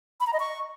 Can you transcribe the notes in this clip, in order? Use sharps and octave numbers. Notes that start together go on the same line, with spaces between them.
B5
A#5
D#5
C#6